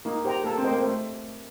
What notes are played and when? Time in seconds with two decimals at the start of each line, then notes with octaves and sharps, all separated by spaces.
0.05 A#3 D#4
0.25 G4 C5 G5 A#5
0.44 A#3 A4
0.57 C4
0.64 C5 D#5 G5
0.71 A#3
0.83 A3 C5